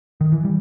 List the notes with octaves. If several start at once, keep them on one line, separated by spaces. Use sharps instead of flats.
D#3
E3
G3